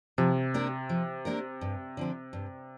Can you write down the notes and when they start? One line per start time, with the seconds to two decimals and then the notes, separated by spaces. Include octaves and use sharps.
0.18 C3 F3
0.54 A#3 D4 G4 A#4
0.89 F3
1.25 A#3 D4 G4 A#4
1.61 G2
1.97 D3 F3 C4
2.33 G2